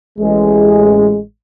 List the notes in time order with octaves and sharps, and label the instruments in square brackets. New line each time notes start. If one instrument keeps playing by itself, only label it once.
[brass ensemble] A1 G#3